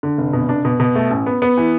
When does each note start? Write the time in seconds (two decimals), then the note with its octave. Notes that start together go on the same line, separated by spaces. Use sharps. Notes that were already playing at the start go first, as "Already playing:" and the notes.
0.03 D3
0.18 F1
0.33 B2
0.49 D4
0.65 B2
0.80 B2
0.95 A3
1.11 A1
1.26 B3
1.42 B3
1.58 E3